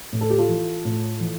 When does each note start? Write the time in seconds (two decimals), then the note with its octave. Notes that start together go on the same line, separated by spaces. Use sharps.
0.13 A2
0.21 A4
0.30 G4
0.38 F4 A4
0.48 E3
0.85 A2
1.20 E3